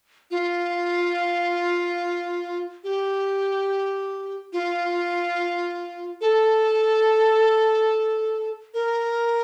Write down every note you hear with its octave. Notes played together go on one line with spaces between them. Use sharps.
F4
G4
F4
A4
A#4